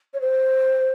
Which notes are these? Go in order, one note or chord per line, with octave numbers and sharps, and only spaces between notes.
C#5
C5